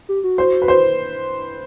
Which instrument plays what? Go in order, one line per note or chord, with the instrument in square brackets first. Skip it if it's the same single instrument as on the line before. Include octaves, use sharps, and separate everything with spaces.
[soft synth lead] G4
F#4
[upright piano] C5
B4
C5